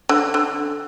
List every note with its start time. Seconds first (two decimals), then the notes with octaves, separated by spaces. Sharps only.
0.09 D3
0.34 D3